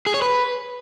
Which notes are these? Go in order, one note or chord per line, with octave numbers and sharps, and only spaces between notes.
G#4
C#5
B4